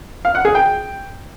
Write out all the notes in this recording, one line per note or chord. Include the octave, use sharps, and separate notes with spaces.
F5
F#5
G#4
G5